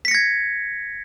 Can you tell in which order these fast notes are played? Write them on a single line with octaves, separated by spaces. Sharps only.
B6 C#7 A#6 G#6